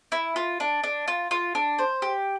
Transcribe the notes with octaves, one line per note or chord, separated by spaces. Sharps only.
E4
F4
D4
D4
F4
F4
D4
C5
G4